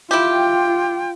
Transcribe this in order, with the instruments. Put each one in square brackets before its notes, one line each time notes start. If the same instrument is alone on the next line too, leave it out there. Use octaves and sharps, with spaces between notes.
[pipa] E4 G4 [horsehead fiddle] F4 [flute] G5